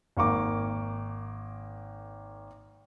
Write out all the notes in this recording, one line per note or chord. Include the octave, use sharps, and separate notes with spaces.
G#1 A#3 C#6 D6